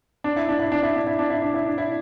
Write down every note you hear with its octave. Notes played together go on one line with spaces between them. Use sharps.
D4
E4
D4
E4
D4
E4
D4
E4
D4
E4
D4
E4
D4
E4